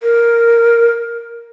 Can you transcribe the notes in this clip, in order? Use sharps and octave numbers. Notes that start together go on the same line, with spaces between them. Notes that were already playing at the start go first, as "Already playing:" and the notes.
A#4